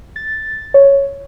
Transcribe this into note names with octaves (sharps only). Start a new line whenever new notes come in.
A6
C#5